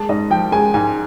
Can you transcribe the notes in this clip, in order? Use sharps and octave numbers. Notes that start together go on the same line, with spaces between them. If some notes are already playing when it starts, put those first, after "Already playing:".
Already playing: G#3 A5
G#2 D#5
F3 G5
G#3 G#5
G#2 G#5